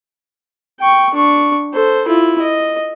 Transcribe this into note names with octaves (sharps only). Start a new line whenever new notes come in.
G5 C#6
D4 C#6
A4 C5
E4 F4
D#5